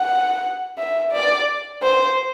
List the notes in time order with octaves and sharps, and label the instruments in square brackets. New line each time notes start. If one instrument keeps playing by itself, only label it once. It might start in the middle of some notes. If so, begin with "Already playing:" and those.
Already playing: [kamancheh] F#5
E5
D5
C5